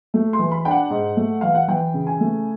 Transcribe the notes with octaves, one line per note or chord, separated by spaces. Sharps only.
A3
C6
E3
B5
D4 G5
F#5
G#2
A3
E3 F5
F#5
E3 G5
C#3
G#5
A3